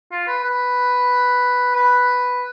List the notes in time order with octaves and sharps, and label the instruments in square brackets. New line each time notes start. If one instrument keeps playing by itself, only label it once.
[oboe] F4
B4
B4
B4